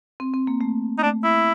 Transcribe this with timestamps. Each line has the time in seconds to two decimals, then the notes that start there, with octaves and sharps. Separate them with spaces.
0.20 C4
0.34 C4
0.47 A#3
0.61 A3
0.98 D#4
1.02 A3 D4
1.23 E4